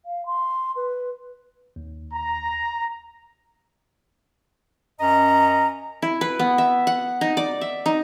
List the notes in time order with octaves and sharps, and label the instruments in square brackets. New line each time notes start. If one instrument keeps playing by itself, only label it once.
[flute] F5
C6
B4
[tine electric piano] D#2
[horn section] A#5
[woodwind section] F#2 C#4 D#5 A#5
[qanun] E4
B4
B3
E5
F#5
D#4
D5
E5
D#4